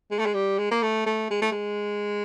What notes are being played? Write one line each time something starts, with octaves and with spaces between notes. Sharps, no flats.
G#3
A3
G#3
G3
G#3
A#3
A3
A3
G#3
A3
G#3